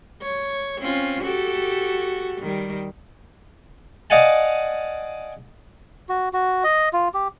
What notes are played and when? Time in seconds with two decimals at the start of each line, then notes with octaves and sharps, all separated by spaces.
0.22 C#5
0.79 C4 C#4 F4
1.23 F#4 G4 A4
2.41 D#3 G3
4.10 D5 D#5 F5 F#5 G#5 A5
6.09 F#4
6.33 F#4
6.64 D#5
6.93 F4
7.14 G4